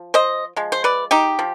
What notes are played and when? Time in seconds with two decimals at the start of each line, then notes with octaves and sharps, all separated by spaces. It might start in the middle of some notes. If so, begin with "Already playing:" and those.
Already playing: F3
0.14 C5 D#5
0.56 F3 G#3
0.72 C5
0.84 B4 D5
1.11 D#4 G4
1.39 F3